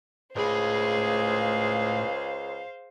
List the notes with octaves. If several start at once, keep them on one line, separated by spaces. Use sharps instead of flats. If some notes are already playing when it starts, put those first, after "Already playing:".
C#2 A2 G#4 C5 F5 B5